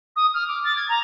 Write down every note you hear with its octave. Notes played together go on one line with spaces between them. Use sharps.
D#6
F6
D6
A6
G#6
A#5